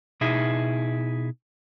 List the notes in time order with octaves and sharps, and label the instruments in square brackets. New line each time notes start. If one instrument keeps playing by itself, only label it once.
[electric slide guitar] B2 D#4 E4 G#4